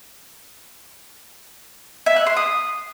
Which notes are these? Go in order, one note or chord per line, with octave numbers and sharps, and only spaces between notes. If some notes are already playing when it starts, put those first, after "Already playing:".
E5
F#6
C6
D#6